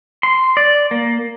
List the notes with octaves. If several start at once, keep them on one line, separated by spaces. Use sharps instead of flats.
C6
D5
A#3